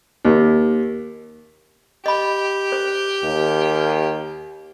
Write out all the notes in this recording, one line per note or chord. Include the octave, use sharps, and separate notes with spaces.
D#2
G4 D#5 B5
C5
D#2